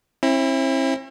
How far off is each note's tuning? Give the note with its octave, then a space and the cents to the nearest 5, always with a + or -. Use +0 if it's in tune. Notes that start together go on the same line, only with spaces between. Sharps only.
C4 +45 E4 +0